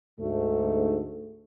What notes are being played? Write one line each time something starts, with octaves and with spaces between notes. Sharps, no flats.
D2 G#2 A3